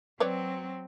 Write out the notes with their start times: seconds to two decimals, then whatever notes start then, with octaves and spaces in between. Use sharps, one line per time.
0.20 F#3 C4 B4 C#5 D5